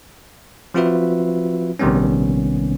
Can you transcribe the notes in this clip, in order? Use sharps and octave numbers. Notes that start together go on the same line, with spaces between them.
F3 C4 F4 F#4 B4 E5
A#1 C3 D#3 G3 B3 C#4